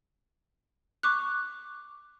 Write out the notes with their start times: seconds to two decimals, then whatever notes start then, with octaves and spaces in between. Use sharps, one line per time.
1.03 C#6 D6 F#6